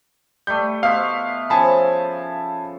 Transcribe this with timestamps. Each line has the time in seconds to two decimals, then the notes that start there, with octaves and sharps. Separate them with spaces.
0.47 G3 A3 G6
0.83 B2 E5 F5 C6
1.50 C#3 F3 G#5 A5 B5